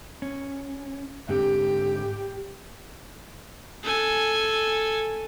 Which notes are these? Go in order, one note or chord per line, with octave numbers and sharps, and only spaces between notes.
C#4
G#2 D3 C4 G4
A4 G#5